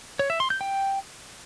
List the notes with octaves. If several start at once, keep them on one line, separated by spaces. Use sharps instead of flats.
C#5
E5
C6
G6
G5